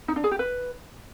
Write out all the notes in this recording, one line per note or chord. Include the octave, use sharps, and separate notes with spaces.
D#4
D4
G#4
G4
B4